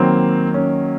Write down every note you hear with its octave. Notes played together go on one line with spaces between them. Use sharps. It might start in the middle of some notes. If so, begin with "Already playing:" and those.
Already playing: D#3 F#3 A#3 C4
C#4